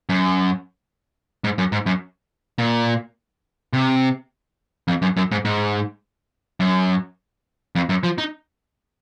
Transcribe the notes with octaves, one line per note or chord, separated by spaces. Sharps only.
F#2
G#2
F#2
G#2
F#2
A#2
C3
F2
F#2
F#2
G#2
G#2
F#2
F2
F#2
F3
D#4